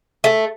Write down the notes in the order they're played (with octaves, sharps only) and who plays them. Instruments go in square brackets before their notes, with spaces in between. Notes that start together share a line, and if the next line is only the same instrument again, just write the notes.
[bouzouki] A3